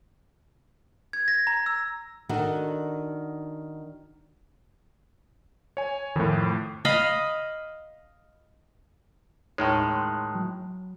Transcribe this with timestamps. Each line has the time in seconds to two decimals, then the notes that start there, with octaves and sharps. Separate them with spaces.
1.13 G#6
1.28 A#6
1.47 A#5
1.66 E6
2.29 D#3 D4 F#4 A4
5.77 C#5 G#5
6.16 F2 A2 D#3
6.85 D#5 F5 B5
9.58 D#2 A2 D#3 G#3 D#4 C#5
9.95 C6 F#6
10.35 F#3